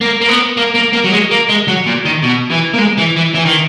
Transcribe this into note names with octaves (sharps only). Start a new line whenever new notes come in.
A#3
A#3
B3
A#3
A#3
A#3
F#3
G#3
A#3
G#3
F#3
A#2
D#3
B2
E3
A#3
G#3
E3
E3
E3
D#3